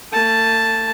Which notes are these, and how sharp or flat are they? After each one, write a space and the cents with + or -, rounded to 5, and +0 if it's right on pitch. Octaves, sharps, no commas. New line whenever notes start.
A3 +40 A5 +0